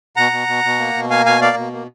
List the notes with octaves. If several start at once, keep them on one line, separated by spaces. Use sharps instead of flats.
B2 F#5 A#5
B2
B2
B2
A#3
B2
A#3 F5 G#5
B2 F5 G#5
A#3 D5 F5
B2
A#3